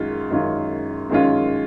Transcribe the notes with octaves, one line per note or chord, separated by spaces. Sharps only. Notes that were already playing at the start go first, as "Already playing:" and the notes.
Already playing: F#2 D#3 G#3 C#4 F4
F#2 D#3 G#3 C#4 F4
F#2 D#3 G#3 C#4 F4